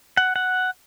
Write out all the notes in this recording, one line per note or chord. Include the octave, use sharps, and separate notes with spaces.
F#5
F#5